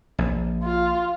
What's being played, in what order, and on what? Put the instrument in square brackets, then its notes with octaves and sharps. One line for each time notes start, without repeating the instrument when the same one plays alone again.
[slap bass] A#1
[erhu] F4